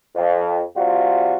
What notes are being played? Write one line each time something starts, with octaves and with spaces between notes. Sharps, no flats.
F2
C3 G3 F4 F#4